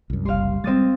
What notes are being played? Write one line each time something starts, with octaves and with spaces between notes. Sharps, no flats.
C2 F#2
F#1 C2 G3 F5 C6
G3 G#3 C4 D#6 A6